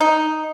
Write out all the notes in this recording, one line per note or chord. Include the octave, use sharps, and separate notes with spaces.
D#4